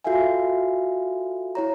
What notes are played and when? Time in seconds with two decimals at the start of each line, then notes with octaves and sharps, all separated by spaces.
0.04 F4 F#4 A4 E5 F5 G#5
1.55 E4 C#5 A#5